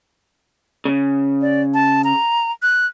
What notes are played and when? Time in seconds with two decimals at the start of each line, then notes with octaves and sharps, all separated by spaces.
0.85 C#3
1.41 D5
1.74 A5
2.04 A#5
2.62 F#6